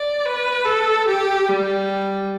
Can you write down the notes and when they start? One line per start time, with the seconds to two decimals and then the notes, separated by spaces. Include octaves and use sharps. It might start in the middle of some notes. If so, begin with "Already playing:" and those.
Already playing: D5
0.25 B4
0.65 A4
1.07 G4
1.49 G3